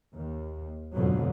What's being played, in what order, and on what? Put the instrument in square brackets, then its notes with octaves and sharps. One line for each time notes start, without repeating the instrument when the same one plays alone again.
[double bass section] D#2
G#1 F2 B2 D3 F3 F#3